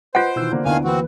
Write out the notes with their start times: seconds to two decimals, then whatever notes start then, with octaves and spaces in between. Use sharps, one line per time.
0.15 F4 B4 C5 D#5 F#5 F#6 D7
0.36 B2 D#3 E3 E6 G6
0.52 D3 A#3 D4 C5
0.65 D2 D#3 B3 D4 E4 F5 G#5
0.85 E3 A#3 C4 F#4 B4